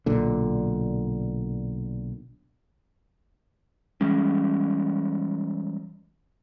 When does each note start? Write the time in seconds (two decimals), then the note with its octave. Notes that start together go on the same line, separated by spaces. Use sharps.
0.06 B1 A#2 D3
4.01 E3 G3 G#3 C#4